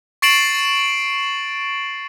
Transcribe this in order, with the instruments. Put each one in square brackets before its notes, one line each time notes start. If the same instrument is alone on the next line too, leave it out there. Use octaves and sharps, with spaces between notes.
[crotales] C#6 A6 C7 D7 E7 F#7